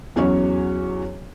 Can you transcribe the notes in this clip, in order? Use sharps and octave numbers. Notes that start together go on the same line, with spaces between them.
E2 F#3 C#4 F#4 C#5